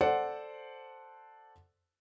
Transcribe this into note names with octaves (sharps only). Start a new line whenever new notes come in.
A4 C5 D5 F#5